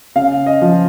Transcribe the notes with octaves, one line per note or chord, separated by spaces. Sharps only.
C#3 F5
D#5
F3